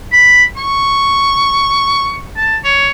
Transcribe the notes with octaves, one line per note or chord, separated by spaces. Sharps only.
B5
C#6
A5
C#5